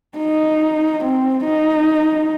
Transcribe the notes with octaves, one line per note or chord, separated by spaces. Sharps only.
D#4
C4
D#4